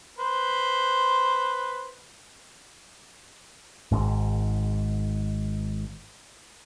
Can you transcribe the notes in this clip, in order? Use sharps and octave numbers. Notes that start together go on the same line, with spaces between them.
B4 C5
G#1 G#2